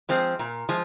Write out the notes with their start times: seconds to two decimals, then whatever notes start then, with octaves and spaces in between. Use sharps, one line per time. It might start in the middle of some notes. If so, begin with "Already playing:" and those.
0.09 F3 G#3 C4
0.39 A#2
0.69 F3 G#3